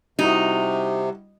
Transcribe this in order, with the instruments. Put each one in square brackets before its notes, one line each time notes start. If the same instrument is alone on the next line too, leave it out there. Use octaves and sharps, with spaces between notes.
[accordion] C3 [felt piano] G3 E4 F#4 [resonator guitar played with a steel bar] D#4